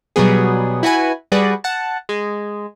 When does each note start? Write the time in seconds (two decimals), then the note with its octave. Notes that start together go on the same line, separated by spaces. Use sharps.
0.16 B2 F#3 G3 B3 G#4
0.83 E4 F#4 B4 G#5
1.32 G3 F#4 G#4 B4 D5
1.64 F#5 A5
2.09 G#3